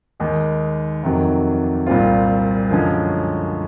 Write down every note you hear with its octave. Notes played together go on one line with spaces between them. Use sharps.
D#2 D#3 G#3
F2 C3 D#3 F#3
C2 A#2 G3 C4 F4
F#2 D3 F3 G#3 C#4